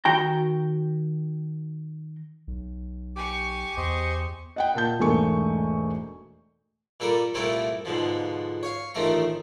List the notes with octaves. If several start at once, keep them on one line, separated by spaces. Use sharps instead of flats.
D#3 F#4 G5 A#5
B1
G4 G#5 C#6 D6
E2 G4 C5 D#5
D#5 F#5 G5
A#2 A5 G6
E1 G#2 A3 A#3 G#5 C#6
A#2 G3 A4 A#4
C2 A#2 A3 C4 E4 A4
G#2 B2 D3 F3
C#5 F5
A1 D#3 F3 A3 C4 A#5